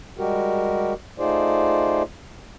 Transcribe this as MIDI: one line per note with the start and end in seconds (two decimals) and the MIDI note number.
0.18 0.94 55
0.18 0.94 56
0.18 0.94 66
0.18 0.94 67
0.18 0.94 70
1.19 2.03 57
1.19 2.03 63
1.19 2.03 65
1.19 2.03 68
1.19 2.03 72
1.19 2.03 74